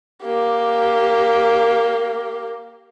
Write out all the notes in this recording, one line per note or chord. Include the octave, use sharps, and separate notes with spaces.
A#3 G4